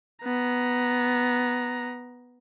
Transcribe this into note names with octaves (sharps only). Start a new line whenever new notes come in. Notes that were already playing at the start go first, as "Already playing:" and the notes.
B3 A#5